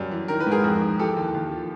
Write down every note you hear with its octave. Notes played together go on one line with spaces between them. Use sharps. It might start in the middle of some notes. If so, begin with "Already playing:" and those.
Already playing: F#2 G3
E3
D#3 A#4
B4
G#2 G#4 A#4
F2
F2
E3 G4 A4
D#2
D#2
F3